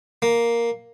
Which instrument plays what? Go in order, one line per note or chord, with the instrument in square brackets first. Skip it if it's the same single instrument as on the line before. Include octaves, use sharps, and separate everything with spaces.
[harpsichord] A#3